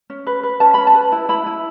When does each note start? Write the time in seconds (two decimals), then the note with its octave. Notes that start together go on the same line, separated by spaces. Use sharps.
0.10 C#4
0.27 B4
0.43 B4
0.60 C#4 A5
0.74 C#4 B5
0.87 A5
0.95 B4
1.12 E4
1.29 E4 B5
1.46 E4